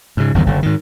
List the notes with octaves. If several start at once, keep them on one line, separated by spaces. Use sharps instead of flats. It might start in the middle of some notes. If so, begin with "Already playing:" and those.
G#2 C#3
G1 E2 G2 D#3
F#1 D3
G#2 D#3